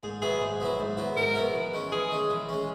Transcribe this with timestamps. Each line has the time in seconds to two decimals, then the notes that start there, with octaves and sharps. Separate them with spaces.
0.03 G#2 G#4
0.22 F#3 B3 E4 G#4
0.41 G#2
0.60 F#3 B3 E4
0.79 G#2
0.97 F#3 B3 E4
1.17 G#2 A#4
1.35 F#3 B3 E4
1.55 E3
1.74 G#3 C#4
1.92 E3 G#4
2.11 G#3 C#4
2.30 E3
2.49 G#3 C#4